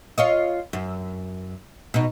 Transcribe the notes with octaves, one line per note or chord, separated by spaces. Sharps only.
F4 C#5 D#5
F#2
B2 D#4